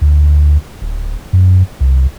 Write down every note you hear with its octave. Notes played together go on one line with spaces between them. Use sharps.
D2
D1
F#2
C2